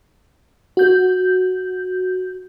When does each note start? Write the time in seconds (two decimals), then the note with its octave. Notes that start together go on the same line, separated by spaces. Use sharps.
0.77 F#4 G6